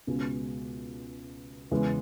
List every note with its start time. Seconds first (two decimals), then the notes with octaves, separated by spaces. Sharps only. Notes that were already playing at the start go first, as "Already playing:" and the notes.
0.07 C#2 B2 G#3
1.71 E2 C#3 E3 G#3